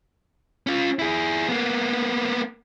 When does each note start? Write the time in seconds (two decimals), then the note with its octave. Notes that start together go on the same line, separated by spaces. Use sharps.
0.67 C#4 F4
0.99 E4 G#4
1.49 A#3 B3